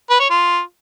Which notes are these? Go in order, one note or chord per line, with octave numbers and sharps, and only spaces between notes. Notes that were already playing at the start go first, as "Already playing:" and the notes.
B4
C#5
F4